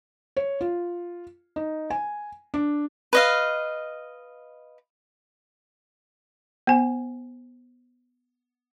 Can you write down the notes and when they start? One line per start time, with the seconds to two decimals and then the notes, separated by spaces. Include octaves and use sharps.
0.36 C#5
0.61 F4
1.56 D#4
1.90 G#5
2.54 D4
3.13 B4 D#5 F5
6.67 B3 C5 G#5